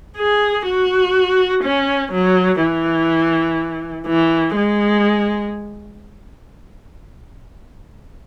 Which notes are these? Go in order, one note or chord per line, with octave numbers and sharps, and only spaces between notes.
G#4
F#4
C#4
F#3
E3
E3
G#3